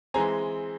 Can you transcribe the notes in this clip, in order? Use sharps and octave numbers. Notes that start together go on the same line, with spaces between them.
E3 G#3 C4 G#5 A#5